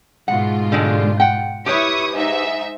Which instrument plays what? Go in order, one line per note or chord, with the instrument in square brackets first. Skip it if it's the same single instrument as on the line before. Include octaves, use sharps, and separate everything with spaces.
[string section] G#2 B2 F4 [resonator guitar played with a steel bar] F#5
[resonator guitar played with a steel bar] D3 G3 G#3
F#5 G5
[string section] E4 C#6 D#6 [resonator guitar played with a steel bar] G4 B4 C#5
[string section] G#2 D#4 E5